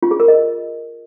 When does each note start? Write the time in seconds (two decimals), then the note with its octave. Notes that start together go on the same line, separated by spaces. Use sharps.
0.03 F4
0.11 G#4
0.20 A#4
0.28 D#5